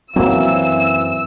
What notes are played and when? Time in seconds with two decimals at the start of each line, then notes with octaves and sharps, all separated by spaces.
0.16 F#2 E3 F#3 A#3 C4 E6